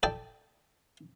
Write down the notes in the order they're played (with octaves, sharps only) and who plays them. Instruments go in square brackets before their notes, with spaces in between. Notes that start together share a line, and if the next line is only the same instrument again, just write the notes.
[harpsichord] A4 D5 G5 A5